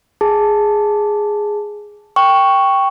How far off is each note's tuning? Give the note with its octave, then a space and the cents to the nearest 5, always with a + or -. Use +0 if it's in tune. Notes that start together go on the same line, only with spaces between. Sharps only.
G#4 +0 A5 +0
G5 +0 C#6 +0